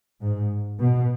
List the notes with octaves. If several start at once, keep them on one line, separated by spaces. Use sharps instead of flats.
G#2
B2